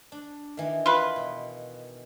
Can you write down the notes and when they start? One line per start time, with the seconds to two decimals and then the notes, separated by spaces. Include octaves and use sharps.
0.12 D4
0.57 D#3 E3
0.86 F4 B4
1.16 B2